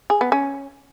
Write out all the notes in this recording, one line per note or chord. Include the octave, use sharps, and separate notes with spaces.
G#4
B3
C#4